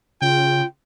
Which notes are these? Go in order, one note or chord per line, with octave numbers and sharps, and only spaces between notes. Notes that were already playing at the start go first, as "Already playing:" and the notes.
C#3 F4 G5